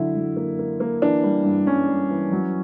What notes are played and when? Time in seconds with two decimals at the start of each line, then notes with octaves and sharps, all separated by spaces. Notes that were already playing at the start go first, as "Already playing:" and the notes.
Already playing: D3 F#3 E4
0.16 F#3
0.36 A#3
0.59 A#3
0.80 A#3
1.02 E3 D4
1.24 G3
1.45 G2
1.67 G3 C#4
1.88 G3
2.10 E3
2.32 F#3